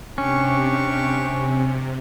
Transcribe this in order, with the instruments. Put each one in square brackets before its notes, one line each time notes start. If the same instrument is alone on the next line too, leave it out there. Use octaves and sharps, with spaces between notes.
[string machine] C3 [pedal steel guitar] C#4 [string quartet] D4 G4 C#6